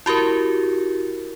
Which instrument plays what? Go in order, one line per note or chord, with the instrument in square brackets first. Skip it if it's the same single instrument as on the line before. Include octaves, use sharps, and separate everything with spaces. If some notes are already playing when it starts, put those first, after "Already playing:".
[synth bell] E4 F#4 G4 A#4